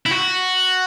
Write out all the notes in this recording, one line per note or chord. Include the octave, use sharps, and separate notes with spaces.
E4
F#4